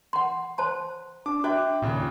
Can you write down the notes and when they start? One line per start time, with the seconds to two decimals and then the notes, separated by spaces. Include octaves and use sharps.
0.13 F#5 C6
0.58 C5 A5 C6
1.26 D4 D6
1.44 F#4 E5 G5 D6 F#6
1.82 D#2 A#2 C#3